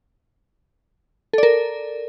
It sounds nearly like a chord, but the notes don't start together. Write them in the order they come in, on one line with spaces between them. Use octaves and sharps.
A4 D5 A#4